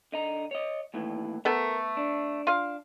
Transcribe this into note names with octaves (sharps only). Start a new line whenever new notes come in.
D3 D#5 A#5
C#5 D#5
D#2 A2 E3
A3 B3 A4 A#4
D4
F4 F5